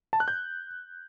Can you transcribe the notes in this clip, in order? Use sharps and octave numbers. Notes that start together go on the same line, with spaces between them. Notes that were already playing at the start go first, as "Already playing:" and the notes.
A5
F#6
G6